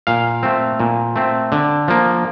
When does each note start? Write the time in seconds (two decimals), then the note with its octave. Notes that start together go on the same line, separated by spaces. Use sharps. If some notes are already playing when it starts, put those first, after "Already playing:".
0.07 A#2 F5
0.43 A3 C4
0.80 A#2
1.16 A3 C4
1.52 D3
1.88 F3 A#3